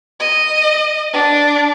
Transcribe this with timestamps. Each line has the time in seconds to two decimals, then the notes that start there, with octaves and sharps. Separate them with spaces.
0.20 D#5
1.13 D4